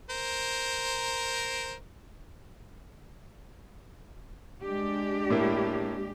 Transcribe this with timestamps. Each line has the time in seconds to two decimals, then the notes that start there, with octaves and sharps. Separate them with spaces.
0.10 A#4 C5
4.63 G#3 D4 G4
5.30 A2 A#3 E4